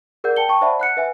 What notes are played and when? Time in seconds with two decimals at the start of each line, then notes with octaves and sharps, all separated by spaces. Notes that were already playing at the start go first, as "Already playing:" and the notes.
0.24 G#4 A#4 D5 F#5 G6
0.36 G5 A5 C#7 G7
0.49 G5 A5 C#6
0.61 C5 D5 E5 F#5 A5 B5
0.80 F#5 F#6 C#7
0.97 B4 E5 F#5 G#5